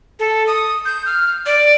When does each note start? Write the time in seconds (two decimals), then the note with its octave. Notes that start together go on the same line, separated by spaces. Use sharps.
0.20 A4
0.47 D#6
0.86 G6
1.06 F6
1.46 D5